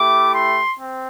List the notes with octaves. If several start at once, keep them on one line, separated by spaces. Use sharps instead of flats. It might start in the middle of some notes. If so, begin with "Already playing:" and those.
Already playing: A3 E4 G4 D6
C6
C4